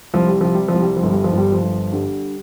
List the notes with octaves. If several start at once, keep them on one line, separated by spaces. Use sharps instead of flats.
C2 F3
G3
C3 F3
G3
F3
C2
G3
F3
G1
G3
F3
G1 G3
F3
G1
D3 G3